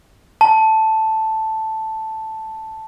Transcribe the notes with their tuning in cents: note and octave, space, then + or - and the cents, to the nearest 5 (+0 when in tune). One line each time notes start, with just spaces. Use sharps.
A5 +0